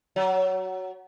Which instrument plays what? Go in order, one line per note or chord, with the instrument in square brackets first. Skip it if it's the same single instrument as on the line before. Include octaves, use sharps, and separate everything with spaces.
[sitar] F#3